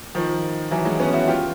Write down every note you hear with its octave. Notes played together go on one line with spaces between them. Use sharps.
D#3 F3
E3 F#3
F#3 G#3
B3 C#4
E4 F#4
F4 G4